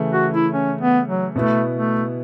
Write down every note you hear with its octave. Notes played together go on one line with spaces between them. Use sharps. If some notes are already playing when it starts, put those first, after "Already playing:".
Already playing: C#3 E3 A3
F#4
E4
C#4
B3
F#3
B2 A3 B3 E4 B4
A3